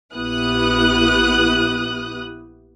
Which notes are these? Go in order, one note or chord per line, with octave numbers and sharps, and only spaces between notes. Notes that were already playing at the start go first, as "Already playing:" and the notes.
A#1 B3 E4 G4 D#6 F#6